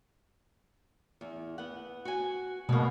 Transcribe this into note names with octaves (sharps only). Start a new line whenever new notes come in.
E2
B3 F#5
F#4 G#5
B2 G#3 A#3